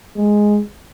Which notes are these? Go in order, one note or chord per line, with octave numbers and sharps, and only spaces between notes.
G#3